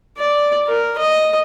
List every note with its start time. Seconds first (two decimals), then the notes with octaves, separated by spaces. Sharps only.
0.17 D5
0.67 A#4
0.98 D#5